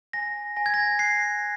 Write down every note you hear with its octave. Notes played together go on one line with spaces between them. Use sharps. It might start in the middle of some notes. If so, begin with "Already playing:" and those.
G#5 A#6
G#5 A#6
G#6
A#6
F#6 C7